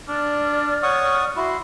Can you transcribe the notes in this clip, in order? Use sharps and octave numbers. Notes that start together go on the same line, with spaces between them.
D4 D5 F6
C#5 F#5 C#6 D#6
E4 F#4 C6